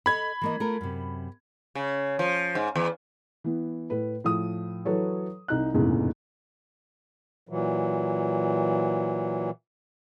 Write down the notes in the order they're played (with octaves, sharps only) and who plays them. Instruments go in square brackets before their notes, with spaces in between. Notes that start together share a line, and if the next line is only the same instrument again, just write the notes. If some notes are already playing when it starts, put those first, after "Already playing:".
[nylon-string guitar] A4 C#5 D#5 [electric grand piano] B5 G#6
[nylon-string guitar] E3 A#3 D#5
A3 F4 A#4
F#2 C3
[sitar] C#3
F3
G#2
E2
[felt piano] E3 B3
A2 B4
A2 F3 D#6
E3 F#3 A4 B4 C#5
C2 D#4 F#6
F1 A#1 E2 G#2 C#3 E3
[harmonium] A#2 E3 F#3